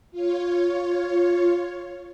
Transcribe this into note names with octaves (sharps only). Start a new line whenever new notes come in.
F4 C#5